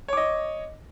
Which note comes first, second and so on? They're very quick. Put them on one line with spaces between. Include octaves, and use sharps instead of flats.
C#5 D6 D#5